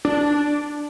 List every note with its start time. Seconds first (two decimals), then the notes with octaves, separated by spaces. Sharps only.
0.05 D4